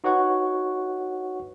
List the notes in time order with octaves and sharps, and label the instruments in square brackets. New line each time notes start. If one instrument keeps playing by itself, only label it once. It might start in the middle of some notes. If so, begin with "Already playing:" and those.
[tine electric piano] D#4 F#4 B4 C#5 F#5 C#6